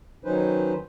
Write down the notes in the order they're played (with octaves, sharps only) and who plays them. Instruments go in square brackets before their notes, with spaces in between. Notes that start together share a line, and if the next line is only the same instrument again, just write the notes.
[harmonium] D#3 F#3 C#4 D#4 B4 C5